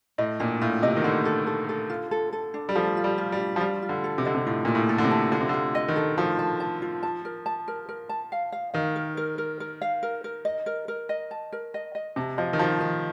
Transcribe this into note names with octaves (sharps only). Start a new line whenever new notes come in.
A2 D#5
A#2 D4
A2 F4
C3 D#5
D#3
D3 D4
A4
A4
A4
F4
A4
A4
D4
G3
F3 A4
F4
G3
F4
G3
D4
F3
G3 F4
F4
D3
A4
C3
D3 D#5
C3
A2 F4
A#2 F4
A2
A4
D3
C3
A5
D3 F4
C3
D3
F4
D#5
D#3
A4
F3 A4
A5
A5
F4
A5
A#4
A5
A#4
A#4
A5
F5
F5
D#3 F5
A#4
A#4
A#4
A#4
F5
A#4
A#4
D#5
A#4
A#4
D#5
A5
A#4
D#5
D#5
C3 A5
F3 D#5
D#3
F3 A5
D#3 D#5